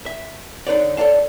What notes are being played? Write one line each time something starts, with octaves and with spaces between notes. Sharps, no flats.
E5
D3 D#4 B4 C#5 D5
A4 C#5 D5 F5 A5